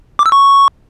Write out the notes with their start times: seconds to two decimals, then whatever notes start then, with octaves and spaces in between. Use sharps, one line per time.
0.19 D6
0.26 E6
0.32 C#6